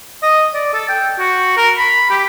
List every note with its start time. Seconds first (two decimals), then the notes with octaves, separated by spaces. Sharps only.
0.23 D#5
0.54 D5
0.74 A4
0.89 G5
1.19 F#4
1.57 A#4
1.78 B5
2.10 G4